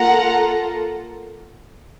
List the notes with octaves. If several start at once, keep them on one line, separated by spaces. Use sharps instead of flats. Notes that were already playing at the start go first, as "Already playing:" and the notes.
Already playing: A#3 F4 A4 F#5 A#5